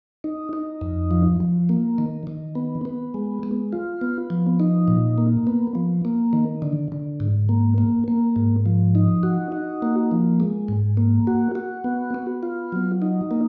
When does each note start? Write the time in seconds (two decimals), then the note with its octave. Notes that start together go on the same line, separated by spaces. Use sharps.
0.24 D#4
0.53 D#4
0.81 F2
1.11 F3
1.40 F3
1.69 A#3
1.98 D#3
2.27 D#3
2.55 B3
2.85 B3
3.14 G#3
3.43 G#3
3.73 F4
4.01 B3
4.30 F3
4.60 D#4
4.88 A#2
5.18 A#3
5.47 B3
5.75 F3
6.05 A#3
6.33 D#3
6.62 D3
6.92 D3
7.20 G#2
7.49 A#3
7.78 A#3
8.08 A#3
8.36 G#2
8.66 F3
8.95 D#4
9.23 F#4
9.52 D#4
9.82 A#3
10.11 F3
10.40 G#3
10.68 G#2
10.97 A#3
11.27 F#4
11.55 F#4
11.84 B3
12.14 B3
12.43 F4
12.72 F#3
13.02 D#4
13.31 A#3